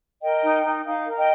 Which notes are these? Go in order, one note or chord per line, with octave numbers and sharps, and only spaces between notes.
A#4 D#5 G5
D#4
D#4
D#4 F5
A#4
D#5 G5